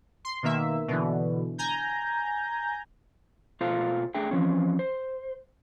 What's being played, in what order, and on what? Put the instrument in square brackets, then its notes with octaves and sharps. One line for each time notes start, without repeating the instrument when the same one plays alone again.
[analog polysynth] C6
B2 D#3 A#3 E5
B2 D3 E3
G#5 A#5 G6
[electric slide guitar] B2 F4 A4 C5 F5
A3 D4 G#4 G5
E3 F3 C4 C#4
C5